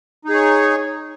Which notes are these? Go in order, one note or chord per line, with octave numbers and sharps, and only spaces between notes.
D#4 G#4 C#5